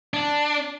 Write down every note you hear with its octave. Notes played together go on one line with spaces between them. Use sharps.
D4